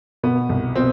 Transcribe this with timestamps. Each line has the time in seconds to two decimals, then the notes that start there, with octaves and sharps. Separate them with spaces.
0.23 B2 B3
0.49 C2
0.75 B2 C4